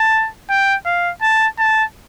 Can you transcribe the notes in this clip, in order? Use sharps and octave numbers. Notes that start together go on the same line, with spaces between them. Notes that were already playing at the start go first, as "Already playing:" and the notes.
Already playing: A5
G5
F5
A5
A5